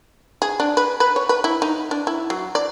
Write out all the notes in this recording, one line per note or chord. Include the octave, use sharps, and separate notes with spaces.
G#4
D4
B4
B4
C#5
B4
E4
D#4
D4
E4
F#3
D5